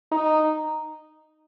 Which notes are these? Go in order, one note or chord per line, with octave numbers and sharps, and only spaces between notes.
D#4